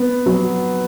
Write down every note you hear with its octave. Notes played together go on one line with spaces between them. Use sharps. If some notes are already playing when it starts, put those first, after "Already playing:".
Already playing: B3
F#3